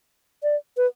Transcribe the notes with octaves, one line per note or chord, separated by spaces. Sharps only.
D5
B4